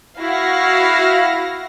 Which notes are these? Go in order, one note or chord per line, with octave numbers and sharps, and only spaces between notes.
E4 F#4 F5 A#6